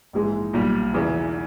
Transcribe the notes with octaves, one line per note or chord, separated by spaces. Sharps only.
A#1 G#2 E3 G#3
B1 A#2 G3
E1 E2 C#3 E3